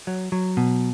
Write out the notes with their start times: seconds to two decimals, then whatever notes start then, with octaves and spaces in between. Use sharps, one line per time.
0.07 F#3
0.32 F#3
0.57 B2